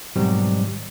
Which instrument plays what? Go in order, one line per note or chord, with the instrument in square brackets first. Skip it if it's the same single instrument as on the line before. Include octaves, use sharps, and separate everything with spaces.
[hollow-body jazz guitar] G#2 B2 D#3 F#3 G3 C4